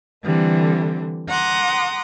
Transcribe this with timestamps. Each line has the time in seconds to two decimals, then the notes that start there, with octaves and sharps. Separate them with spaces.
0.24 D3 E3 G3 A3 C4
1.29 F#5 A#5 C6 D6 D#6